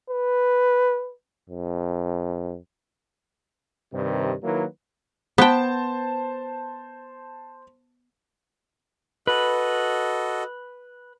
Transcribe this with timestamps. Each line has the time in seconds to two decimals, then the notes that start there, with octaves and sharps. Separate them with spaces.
0.10 B4
1.50 F2
3.93 G2 C3 D#3
4.43 D#3 F#3 A#3 E4 A#4 B4
5.38 B3 C5 G5 A5
9.27 F#4 A4 B4 D#5